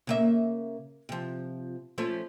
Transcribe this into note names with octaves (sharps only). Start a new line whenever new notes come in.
C#3 A#3 E5
C3 F3
F3 A3 C#4